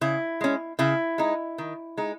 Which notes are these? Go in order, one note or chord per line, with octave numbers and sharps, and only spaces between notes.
C#3 E4
G#3 C#4
C#3 E4
G#3 D#4
D#3
G#3 D#4